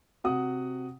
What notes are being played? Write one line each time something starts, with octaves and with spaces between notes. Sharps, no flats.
C3 F#4 F#5 D#6